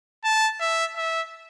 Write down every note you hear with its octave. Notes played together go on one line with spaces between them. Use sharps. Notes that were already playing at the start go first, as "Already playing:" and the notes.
A5
E5
E5